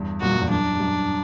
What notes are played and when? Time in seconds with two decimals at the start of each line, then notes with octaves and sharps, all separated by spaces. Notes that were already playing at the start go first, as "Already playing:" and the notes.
Already playing: E2 G2
0.21 F#2 A#2 F#4
0.32 F#2
0.41 E2
0.51 F#2 D4
0.75 G2
0.80 F#2